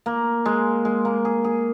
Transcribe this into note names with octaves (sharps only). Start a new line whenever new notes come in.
A#3
G#3
G#3
A#3
G#4
G#4